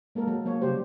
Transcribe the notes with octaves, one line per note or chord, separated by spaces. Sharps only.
G#3 A#3 A4 A#4
F#3
F#3 A#3 C#5
C#3 G3 G4 C5